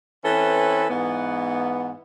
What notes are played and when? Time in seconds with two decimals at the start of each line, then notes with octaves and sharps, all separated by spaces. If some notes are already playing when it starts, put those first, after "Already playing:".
0.24 E3 C4 C#4 A4 B4
0.90 G#2 E3 B3